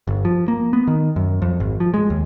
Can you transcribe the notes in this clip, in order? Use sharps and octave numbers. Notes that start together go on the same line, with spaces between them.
G1
F3
A#3
B3
D#3
F#2
F2
G#1
F3
G#3
D#2